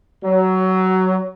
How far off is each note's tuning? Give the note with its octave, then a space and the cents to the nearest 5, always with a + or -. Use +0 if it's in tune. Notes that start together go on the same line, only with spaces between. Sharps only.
F#3 +15